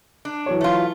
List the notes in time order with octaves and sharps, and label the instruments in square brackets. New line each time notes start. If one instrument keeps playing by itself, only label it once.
[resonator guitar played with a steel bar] D4
[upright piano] E3 F#3 C#5
[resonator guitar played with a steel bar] A3 F4